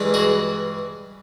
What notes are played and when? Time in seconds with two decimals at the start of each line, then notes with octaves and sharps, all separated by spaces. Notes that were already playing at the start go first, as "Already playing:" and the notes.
Already playing: G2 E3 G#3
0.14 F#4 G#4